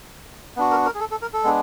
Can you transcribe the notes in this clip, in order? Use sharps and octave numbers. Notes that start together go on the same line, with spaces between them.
B3 D4 F#4
A#4
A#4
G#4
A4
A4
A#4
A4
G#3 B3 D4